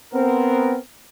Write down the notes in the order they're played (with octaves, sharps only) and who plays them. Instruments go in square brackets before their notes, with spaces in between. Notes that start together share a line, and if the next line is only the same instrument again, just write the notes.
[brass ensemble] B3 C4 A#4